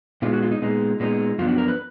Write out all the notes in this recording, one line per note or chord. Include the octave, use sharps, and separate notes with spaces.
A#2 G#3 B3 D#4 F4
F#4
F4
D#4
A#2 G#3 B3 D#4
A#2 G#3 B3 D#4
F#2 F3 B3 D4 F4
F#4
A#4
B4